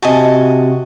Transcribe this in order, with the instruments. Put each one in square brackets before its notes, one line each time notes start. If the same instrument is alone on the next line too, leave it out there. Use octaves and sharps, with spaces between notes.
[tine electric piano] C3 F#4 [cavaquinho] D#5 G#5 A5